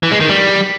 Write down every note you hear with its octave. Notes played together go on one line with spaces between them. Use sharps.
E3
G#3
D#3
G3